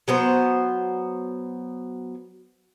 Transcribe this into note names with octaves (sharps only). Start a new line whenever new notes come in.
F#3 B3 C5